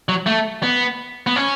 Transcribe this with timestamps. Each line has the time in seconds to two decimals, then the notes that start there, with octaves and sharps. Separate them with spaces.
0.09 F#3
0.26 A3
0.63 B3
1.27 B3
1.36 C#4